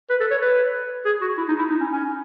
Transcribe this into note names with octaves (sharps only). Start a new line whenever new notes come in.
B4
A4
C#5
B4
G#4
F#4
E4
D#4
E4
D#4
C#4
C#4